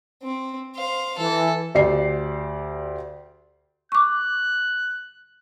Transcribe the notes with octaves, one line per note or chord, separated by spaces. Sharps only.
C4
C5 F5
E3 A4
D2 G4 D5 C7
C#6 D6 F#6